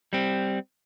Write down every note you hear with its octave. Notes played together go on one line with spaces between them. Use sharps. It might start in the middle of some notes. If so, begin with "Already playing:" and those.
G3 C4